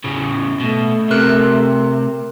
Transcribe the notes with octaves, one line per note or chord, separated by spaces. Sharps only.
A2 C#3
B2 A3
C3 A#4 F#6